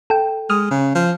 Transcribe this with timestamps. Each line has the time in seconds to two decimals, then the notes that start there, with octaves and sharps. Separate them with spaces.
0.10 A4 G5
0.50 G#3 D#6 F6
0.71 C#3
0.95 F3